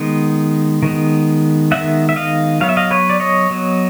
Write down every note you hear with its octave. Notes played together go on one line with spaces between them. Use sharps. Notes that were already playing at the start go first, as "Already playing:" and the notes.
Already playing: D#3 G#3 B3
D#3 G#3 B3
D#3 G#3 B3 E5 F#5
E5
D#5 F5
F#3 B3 F5
E5
D#5 F5
B4 C#5
D5
C#5 D#5
F#3 B3